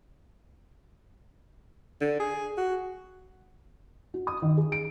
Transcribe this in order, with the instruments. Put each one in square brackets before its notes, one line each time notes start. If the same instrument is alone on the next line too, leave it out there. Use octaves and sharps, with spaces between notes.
[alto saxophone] D3
G#4
F#4
[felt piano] F#4
D#6
D#3
G#4
D7